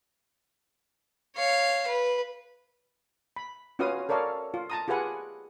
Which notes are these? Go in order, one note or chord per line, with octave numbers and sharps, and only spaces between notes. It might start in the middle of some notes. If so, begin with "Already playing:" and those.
C#5 F5
B4
B5
C#4 F4 F#4 B4 F5 D#6
A4 A#4 C#5 D5 F5
F4
A5 A#5 D#6
F4 G4 G#4 B4 F#5 G#5